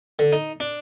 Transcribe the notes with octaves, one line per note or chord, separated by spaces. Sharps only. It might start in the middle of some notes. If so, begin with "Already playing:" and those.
D3
D#4
D4